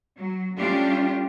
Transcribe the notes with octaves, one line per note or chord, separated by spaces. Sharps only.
F#3
G3 A3 C#4 D4 F4 G4